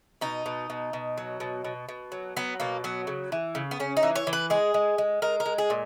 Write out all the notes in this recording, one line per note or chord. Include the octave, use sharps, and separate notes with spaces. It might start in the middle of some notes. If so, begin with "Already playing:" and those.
B2 D#4
B2
B2
B2
F#3
B2
B2
B2
F#3
F#3 B3
B2 A#3
F#3 B3
C#3
E3
C#3
B3
C#3 C#4
D#4
E3
C#5
E3
B4
G#3 G#4
G#3
G#3
G#3 A#4
A#4
G#3
G#4
A#2